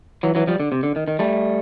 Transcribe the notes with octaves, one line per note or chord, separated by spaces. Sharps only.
E3 F#3
E3 F#3
F3 G3
D3
C3
D3
D#3
D#3
G3 A3